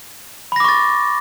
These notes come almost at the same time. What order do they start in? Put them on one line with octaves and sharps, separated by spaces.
B5 A#6 D6 C#6 A6